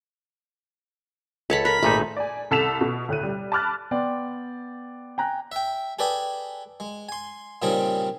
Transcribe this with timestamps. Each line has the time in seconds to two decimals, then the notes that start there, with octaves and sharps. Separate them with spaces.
1.50 C#2 A4 C#5 A5 B5
1.65 A#4 B5
1.83 G#1 A#2 A3 D#4
2.17 D5 G#5
2.51 C2 A4 A5 B6 E7 F7
2.81 B2
3.08 D2 A2 F#6 D#7
3.23 G3
3.52 A5 B5 D6 F6 F#6 A6
3.91 B3 D5 G5 C6
5.18 G5 G#5 A#5 F#6
5.52 E5 G5
5.99 G#4 A4 B4 D5 G5 G#5
6.80 G#3
7.09 G#5 C6
7.62 A#2 C#3 G3 C4 D#4 G#4